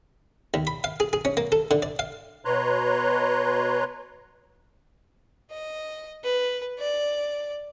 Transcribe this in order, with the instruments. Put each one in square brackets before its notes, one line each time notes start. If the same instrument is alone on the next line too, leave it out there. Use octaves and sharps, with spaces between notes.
[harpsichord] D#2
B5
F5
G#4
G#4
C#4
A#3
A4
D3
D5
F5
[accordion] B2 B4 C#5 A#5 C6 F#6
[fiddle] D#5
B4
D5